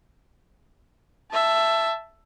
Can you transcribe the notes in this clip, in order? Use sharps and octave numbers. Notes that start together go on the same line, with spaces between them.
E5 A5